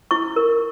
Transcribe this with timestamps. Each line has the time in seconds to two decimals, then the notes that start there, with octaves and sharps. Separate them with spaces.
0.11 E4 C#6
0.36 A#4